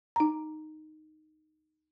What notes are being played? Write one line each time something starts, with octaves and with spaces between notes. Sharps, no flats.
D#4 A#5